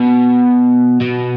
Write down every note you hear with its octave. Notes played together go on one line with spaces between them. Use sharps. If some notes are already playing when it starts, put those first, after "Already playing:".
Already playing: B2
B2